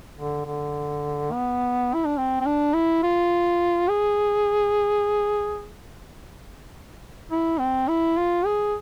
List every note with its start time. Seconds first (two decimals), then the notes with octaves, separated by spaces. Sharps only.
0.17 D3
0.46 D3
1.32 B3
1.94 E4
2.05 D4
2.18 C4
2.41 C4
2.46 D4
2.74 E4
3.03 F4
3.89 G#4
7.31 E4
7.59 C4
7.88 E4
8.17 F4
8.45 G#4